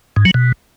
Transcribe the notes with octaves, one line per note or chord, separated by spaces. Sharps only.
G#2
F#3
B2